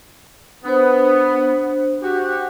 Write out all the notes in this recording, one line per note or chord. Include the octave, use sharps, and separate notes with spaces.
B3 D4 C5
F#4 G4